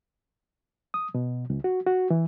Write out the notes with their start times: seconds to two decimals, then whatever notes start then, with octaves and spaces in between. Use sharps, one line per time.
0.94 D#6
1.15 B2
1.50 C#2
1.64 F#4
1.86 F#4
2.10 E3